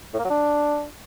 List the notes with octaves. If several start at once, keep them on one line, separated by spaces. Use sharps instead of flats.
A2
A#3
F#3
D4